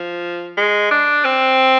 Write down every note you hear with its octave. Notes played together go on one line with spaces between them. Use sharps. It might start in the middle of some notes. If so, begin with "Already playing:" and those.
Already playing: F3
G#3
D4
C4